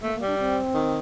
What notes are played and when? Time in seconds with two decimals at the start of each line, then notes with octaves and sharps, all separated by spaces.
0.02 A3 A#3
0.15 A#3
0.22 G3
0.27 D4
0.39 C4
0.74 D#3